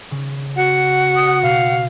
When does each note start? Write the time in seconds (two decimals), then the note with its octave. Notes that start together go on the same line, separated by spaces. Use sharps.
0.11 C#3
0.56 F#4 F#5
1.16 D#6
1.43 B2 F5